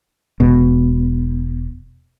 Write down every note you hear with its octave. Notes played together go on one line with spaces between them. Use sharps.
E1 B2